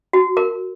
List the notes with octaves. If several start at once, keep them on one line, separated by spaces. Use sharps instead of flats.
F#4
A#4